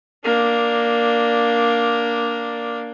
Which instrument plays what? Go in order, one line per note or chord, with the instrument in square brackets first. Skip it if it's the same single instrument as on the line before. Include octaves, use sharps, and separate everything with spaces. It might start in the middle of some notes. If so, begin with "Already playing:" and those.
[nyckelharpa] A#3 D4